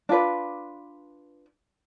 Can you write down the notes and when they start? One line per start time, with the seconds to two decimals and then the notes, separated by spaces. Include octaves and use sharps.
0.09 D4 F4 B4 D5